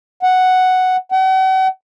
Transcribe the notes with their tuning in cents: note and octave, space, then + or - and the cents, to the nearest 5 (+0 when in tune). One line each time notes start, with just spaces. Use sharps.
F#5 +0
F#5 +40